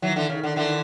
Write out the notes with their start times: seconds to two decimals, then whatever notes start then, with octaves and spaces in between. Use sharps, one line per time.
0.02 D#3 E3 F#3
0.16 D3 E3
0.29 C#3
0.44 D3
0.56 D3 E3